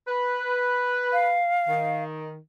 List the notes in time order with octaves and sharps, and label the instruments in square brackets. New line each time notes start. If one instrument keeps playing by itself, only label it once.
[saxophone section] B4
[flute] F5
[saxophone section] D#3